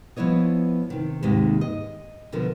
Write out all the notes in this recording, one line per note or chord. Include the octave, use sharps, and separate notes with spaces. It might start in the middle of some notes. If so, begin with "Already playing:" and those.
F3 B3 E4 C#5 D#5
C3 D#3
D#2 G#2 C3 D#3
D#5
B2 D3 F3 A#4